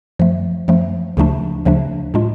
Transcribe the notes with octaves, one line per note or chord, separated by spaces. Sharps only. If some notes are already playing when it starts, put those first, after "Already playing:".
F#2 F3 A3
F#2 F3 A3
D2 C#3 F3 A3 D4
D2 C#3 F3 A3 D4
A2 G#3 D4 F4